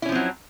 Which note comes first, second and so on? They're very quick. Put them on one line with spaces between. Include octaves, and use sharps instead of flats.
E4 C#4 F3 C4 F#3